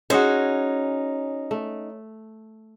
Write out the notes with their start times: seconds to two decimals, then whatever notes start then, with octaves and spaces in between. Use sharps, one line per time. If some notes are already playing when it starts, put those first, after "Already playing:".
0.10 C#4 D#4 F#4 G#4 C5
1.51 A3